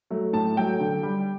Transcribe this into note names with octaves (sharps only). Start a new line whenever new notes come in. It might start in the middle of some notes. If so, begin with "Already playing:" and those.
F#3 A3
A2 A5
F#3 A3 G5
D3
G3